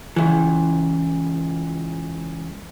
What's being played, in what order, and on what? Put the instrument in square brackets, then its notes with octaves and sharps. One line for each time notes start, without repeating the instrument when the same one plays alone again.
[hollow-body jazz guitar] C#2 E3